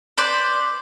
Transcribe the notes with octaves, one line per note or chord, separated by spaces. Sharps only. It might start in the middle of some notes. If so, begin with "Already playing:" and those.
B4 C5 D5